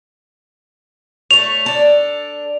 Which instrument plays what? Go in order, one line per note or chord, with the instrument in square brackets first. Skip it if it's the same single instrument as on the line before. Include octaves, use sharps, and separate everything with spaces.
[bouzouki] A3 C#5 [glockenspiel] F7
[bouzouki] D4 A4